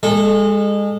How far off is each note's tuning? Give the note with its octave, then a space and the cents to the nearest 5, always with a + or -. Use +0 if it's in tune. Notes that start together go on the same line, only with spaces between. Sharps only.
G#3 -30 A4 -10